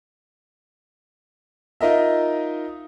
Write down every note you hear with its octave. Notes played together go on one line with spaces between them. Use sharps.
D#4 F4 A#4 D#5 E5